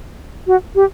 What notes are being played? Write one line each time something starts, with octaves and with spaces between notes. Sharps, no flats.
F#4
G4